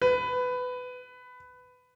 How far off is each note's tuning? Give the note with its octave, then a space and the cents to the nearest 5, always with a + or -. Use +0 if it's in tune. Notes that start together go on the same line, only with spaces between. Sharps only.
B4 +15